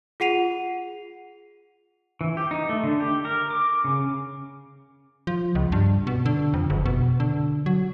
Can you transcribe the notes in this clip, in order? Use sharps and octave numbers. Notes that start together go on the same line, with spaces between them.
F4 G#4 F#5 C7 D#7 F7
E3
G4
D#4
A3
D3
G4
A#4
D6
C#3
F3
C#2
G2
B2
D3
F2
F#1
B2
D3
F#3